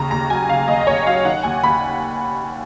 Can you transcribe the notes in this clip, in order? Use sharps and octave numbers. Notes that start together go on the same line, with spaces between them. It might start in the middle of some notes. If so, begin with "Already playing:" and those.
Already playing: D#2 C#3 A#5
D#2 A#5
F#3 G#5
C#3 F5
D#2 D#5
D#5
D#2 C#5
F#3 F5
D#3 F#5
D#2 G#5
D#2 B5